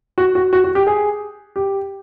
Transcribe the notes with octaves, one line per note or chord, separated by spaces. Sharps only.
F#4
F#4
F#4
F#4
G4
G#4
G4